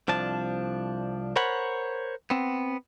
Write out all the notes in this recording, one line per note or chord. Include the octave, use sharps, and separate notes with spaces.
C2 F3 D4 A5
A#4 C5 C#5 F#5 B5
B3 C4